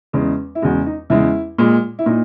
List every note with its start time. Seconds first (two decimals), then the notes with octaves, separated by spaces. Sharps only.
0.13 E2 C#3 G#3
0.55 E4
0.62 E2 C#3 G#3 F#4
0.86 D#4
1.10 E2 C#3 G#3 E4
1.58 A#2 G#3
1.99 E4
2.06 A#2 D#4